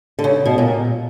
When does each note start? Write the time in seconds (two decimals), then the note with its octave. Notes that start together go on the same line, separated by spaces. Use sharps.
0.19 D3
0.24 C#3
0.45 B2
0.58 A#2